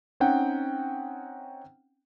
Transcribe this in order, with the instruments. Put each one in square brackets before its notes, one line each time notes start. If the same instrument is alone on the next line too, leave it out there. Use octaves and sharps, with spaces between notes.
[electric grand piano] C4 C#4 D#4 F#5 G5